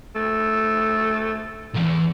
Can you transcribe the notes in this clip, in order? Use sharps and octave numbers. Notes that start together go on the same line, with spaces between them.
A3
B1 E2